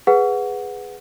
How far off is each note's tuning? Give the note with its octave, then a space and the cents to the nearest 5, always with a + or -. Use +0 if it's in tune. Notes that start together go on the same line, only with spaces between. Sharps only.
G#4 -5 B4 +0 F#5 -10